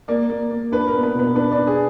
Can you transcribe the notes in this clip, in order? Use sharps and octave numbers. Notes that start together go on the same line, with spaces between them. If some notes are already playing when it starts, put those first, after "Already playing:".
A#3 D5
A#3
A#3
D4 B4
A#4
B3
B4
B2 B4
D4 B4
D5
D4
G#4